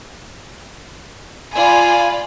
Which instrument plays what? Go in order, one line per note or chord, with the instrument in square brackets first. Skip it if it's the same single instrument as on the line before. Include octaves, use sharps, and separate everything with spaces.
[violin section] F4 D5 B5 [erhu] G#5